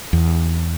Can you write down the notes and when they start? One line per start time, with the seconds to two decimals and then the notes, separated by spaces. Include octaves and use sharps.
0.13 E2